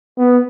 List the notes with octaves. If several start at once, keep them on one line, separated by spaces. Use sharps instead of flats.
B3